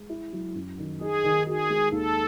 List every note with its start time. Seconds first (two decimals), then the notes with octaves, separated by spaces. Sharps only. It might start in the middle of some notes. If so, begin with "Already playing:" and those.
Already playing: G#3
0.10 E4
0.33 F#3
0.55 F#2
0.78 D#3
1.01 D#4 G#4
1.24 D#3
1.46 F#4 G#4
1.70 G#3
1.92 D#2 A4